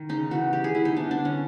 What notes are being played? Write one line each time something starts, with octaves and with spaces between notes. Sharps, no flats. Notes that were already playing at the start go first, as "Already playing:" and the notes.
Already playing: D#3
C#3 D#4
E3 F#4
G3 G4
G#4
G3 E4
D#4
B3 D4
D4
D3
C#4